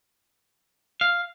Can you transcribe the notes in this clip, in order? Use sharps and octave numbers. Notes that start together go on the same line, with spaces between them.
F5